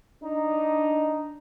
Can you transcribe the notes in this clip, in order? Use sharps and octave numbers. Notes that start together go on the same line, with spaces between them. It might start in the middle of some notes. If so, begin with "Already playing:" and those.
D4 D#4